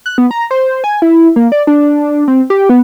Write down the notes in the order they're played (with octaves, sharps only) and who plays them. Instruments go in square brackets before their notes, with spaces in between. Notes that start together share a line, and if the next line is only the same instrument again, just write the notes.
[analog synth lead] F#6
B3
A#5
C5
G#5
E4
A#3
D5
D4
C4
G4
B3